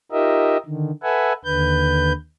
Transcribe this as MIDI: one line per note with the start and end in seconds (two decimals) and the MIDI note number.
0.12 0.57 63
0.12 0.57 65
0.12 0.57 67
0.12 0.57 70
0.12 0.57 75
0.12 0.57 76
0.66 0.91 50
0.66 0.91 51
1.03 1.33 69
1.03 1.33 71
1.03 1.33 76
1.03 1.33 78
1.03 1.33 80
1.44 2.12 39
1.44 2.12 50
1.44 2.12 71
1.44 2.12 91